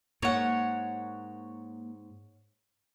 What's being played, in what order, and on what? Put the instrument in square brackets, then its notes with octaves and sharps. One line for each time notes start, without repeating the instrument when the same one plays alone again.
[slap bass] G#2 [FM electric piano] A#3 [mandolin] C#5 F#5